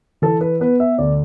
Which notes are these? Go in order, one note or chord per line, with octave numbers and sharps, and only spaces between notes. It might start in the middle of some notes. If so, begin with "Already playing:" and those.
E3 A4
B4
B3 B4
E5
D2 D5